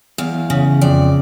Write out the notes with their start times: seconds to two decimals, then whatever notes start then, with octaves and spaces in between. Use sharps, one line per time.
0.18 E2 F5
0.50 C#3
0.81 F2 D5